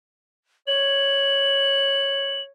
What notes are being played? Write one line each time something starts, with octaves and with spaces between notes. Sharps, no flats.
C#5 F#7